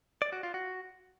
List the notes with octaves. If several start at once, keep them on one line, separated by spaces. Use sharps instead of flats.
D5
F#4
F4
F#4